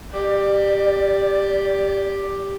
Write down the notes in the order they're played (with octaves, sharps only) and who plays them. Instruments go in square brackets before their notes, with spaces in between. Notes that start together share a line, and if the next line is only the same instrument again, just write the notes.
[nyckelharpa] G4 [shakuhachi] D5